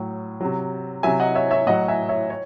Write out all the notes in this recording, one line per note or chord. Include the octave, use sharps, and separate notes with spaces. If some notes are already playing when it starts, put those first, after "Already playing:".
Already playing: A2 F#3
C3 F#3
C3 F#3 E5 G#5
D#5 F#5
C#5 E5
C#5 E5
A2 F#3 D#5 F#5
E5 G#5
C#5 E5
C#5